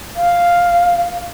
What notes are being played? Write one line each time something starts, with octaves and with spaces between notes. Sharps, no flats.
F5